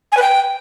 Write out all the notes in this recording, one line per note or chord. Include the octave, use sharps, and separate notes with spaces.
G#5
B4
G5